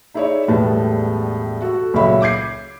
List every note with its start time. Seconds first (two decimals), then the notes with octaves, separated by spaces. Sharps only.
0.14 D#4 E4 G#4 C#5 D5 E5
0.48 E1 A2 G3 B3 A5
1.62 F#4 A4
1.94 C#2 A#2 F#3 C#5 E5 B5
2.22 D6 G6 G#6 C7